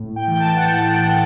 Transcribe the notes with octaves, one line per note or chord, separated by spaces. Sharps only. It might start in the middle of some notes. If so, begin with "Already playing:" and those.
Already playing: A2
G5
E3
G5
A5
F#5
A2 G5
E3